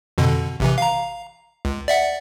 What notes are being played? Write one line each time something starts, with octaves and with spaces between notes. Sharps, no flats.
F2 B2 D3
A1 C3 E3
F5 A#5
C#2
D5 E5 F#5